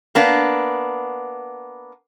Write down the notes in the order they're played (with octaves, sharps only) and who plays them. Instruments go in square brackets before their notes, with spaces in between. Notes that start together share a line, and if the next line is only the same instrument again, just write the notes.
[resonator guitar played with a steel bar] A#3 B3 D4